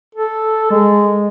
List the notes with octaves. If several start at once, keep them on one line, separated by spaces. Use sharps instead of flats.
A4
G#3